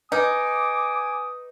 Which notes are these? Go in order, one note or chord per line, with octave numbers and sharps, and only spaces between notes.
D#4 B4 G#5 D6 D#6